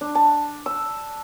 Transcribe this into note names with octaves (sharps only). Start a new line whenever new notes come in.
D4
A5
E6